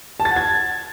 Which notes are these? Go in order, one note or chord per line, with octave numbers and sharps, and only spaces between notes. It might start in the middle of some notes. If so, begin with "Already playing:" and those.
A5
A6
F#5
G#6